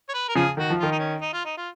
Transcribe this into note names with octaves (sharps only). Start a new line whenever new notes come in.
C#5
B4
A#4
C#3 F3 G#4
D#3 F#4
F3
D#3 F4
D#4
C#4
D#4
F4
D#4
F4